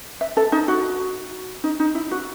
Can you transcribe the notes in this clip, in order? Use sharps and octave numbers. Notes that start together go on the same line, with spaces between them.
E5
A4
D#4
F#4
D#4
D#4
E4
F#4